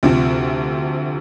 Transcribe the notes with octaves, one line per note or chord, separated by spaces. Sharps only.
D2 C3 F3 C4